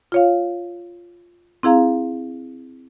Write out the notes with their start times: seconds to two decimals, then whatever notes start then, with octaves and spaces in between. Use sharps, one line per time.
0.12 F4 C#5 F5
1.63 C4 E4 G#4 F5 A#5